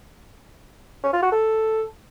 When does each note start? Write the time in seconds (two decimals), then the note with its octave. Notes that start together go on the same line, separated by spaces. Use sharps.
1.03 C#4
1.13 F4
1.22 F#4
1.32 A4